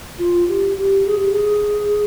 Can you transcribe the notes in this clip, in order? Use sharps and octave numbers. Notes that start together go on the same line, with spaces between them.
F4
G4
G4
G#4
G4
G#4